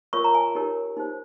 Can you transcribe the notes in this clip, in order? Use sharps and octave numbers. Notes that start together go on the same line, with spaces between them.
F4 A#4 C#5 C#6
A#5
G#5
D#4 G4 A#4 C#5
D#4 G4 C5